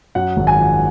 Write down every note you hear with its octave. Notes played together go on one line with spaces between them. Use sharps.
F#2 F#5
G#1
G#5
F3